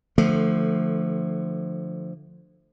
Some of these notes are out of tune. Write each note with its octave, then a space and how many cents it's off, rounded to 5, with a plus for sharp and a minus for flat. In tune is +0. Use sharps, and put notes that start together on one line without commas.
D3 +25 F3 +0 A3 +10